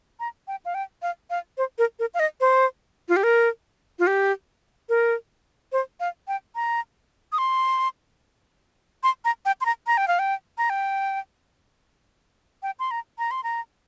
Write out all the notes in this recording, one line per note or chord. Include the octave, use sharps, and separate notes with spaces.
A#5
G5
F5
G5
F5
F5
C5
A#4
A#4
F5
D#5
C5
F4
G4
A#4
F4
G4
A#4
C5
F5
G5
A#5
D#6
C6
C6
A#5
G5
C6
A#5
A#5
G5
F5
G5
A#5
G5
G5
C6
A#5
A#5
C6
A#5